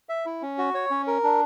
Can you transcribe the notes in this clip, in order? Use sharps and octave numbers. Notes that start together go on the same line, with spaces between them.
E5
E4
C#4
F#4
C#5
C#4
A#4
D4